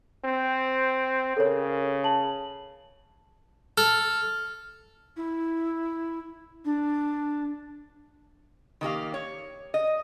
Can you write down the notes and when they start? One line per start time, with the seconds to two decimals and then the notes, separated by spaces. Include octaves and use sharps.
0.25 C4
1.37 C#3 A4 A#4 C#5
2.04 A5 F#7
3.78 A4 F6
5.17 E4
6.65 D4
8.81 D#3 A#3 G4 F5
9.14 C#5
9.74 D#5